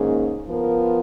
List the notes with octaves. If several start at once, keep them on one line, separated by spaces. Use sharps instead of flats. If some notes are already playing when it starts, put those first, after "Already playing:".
Already playing: G#2 D#3 A#3 C#4 G#4
F3 B3 F4 A#4